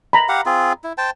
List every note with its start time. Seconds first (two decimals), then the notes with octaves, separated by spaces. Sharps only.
0.13 A#5 B5
0.29 G4 F5 F#5
0.46 C4 F4 G#4
0.84 E4
0.98 C5 G5 A5